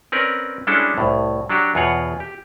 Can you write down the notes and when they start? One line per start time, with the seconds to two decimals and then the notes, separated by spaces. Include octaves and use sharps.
0.12 C4 C#4 A#4 B4 D5
0.67 G3 G#3 C#4 D4 E4 A4
0.98 C2 A2
1.49 F#3 D4 F#4 G4
1.75 E2 B2 F4 C#5 F#5
2.20 G4